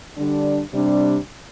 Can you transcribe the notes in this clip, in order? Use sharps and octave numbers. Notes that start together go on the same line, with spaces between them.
D3 G3 D4
C3 G3 D4